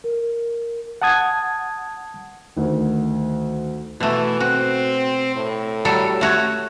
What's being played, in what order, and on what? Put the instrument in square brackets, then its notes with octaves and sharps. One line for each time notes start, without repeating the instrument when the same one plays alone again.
[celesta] A#4
[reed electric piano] F#5 A5 D#6 G#6
[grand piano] D2 D#3
[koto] B2 A3 [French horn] E3
[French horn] C4 [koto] F#4
[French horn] A2
[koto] F#3 G3 A4
A3 F#4 C#5